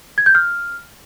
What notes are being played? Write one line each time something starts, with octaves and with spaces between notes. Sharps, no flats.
G#6
G6
F6